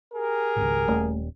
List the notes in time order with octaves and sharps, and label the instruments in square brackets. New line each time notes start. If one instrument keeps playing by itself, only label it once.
[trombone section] G4 G#4 A#4
[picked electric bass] G#1 C#2
[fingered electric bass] D#1 [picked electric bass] A3